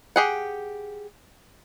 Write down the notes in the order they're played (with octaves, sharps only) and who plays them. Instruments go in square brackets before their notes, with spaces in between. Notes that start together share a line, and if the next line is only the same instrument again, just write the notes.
[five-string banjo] G4 G#4 F#5